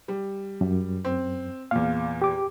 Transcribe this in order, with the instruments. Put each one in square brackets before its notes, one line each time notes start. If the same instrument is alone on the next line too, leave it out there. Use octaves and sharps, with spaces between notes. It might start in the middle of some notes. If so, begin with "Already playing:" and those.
[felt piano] G3
[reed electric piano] F#2
[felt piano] C4
[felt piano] E2 A#2 [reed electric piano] F5
[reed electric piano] G4 D6